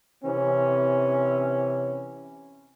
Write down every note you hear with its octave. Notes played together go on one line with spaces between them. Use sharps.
C3 E3 C4 C#4